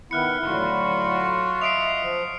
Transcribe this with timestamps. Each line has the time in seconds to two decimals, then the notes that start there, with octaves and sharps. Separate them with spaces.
0.11 D#3 B3 E4 B5 F6 F#6 C#7
0.43 A2 D3 F#3 F4 F#4 B5
1.62 D#5 E5 C7 D7 F7
2.01 F3